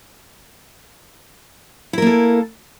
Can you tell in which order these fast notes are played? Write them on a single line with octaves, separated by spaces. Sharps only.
E4 A#4 A#3 A4